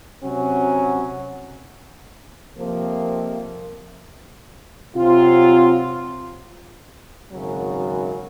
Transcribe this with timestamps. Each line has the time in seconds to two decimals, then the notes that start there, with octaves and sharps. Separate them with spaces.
0.21 C3 F#3 C#4 F#4
2.57 F2 C3 F3 A#3
4.94 C3 F#3 C4 F4
7.30 G#1 F#2 C#3 F#3